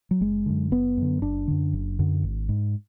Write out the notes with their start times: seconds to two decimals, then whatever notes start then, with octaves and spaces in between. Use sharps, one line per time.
0.11 F#3
0.21 F#1 G#3
0.46 F#2 D3
0.71 F#1 B3
0.97 F#2 D3
1.22 F#1 D4
1.48 F#2 D3
1.73 F#1
1.99 F#2 D3
2.24 G#1
2.49 G#2